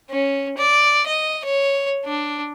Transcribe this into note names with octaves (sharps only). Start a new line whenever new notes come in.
C#4
D5
D#5
C#5
D4